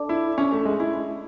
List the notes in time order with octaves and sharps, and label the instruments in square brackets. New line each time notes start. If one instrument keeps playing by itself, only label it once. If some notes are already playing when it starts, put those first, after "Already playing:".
Already playing: [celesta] D4 A4 D5 A5 D6
[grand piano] E4
C#4
A3
G#3
E4